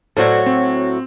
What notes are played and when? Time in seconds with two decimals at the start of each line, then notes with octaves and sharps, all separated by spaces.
0.17 A2 F#3 F#4 A4 C5 D5
0.46 C4